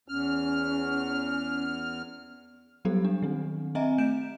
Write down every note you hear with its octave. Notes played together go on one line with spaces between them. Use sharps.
E2 C#4 F6
F#3 G3 B3 G4 A4
D4
D#3 C4
C4 D#5 E5 G#5 A#5
A3 G6 D7 E7